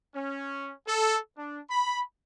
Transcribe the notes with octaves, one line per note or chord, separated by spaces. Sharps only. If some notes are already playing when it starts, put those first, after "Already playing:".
C#4
A4
D4
B5